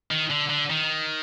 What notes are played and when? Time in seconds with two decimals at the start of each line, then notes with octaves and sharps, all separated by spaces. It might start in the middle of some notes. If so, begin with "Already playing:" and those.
0.11 D#3
0.31 D3
0.50 D3
0.70 D#3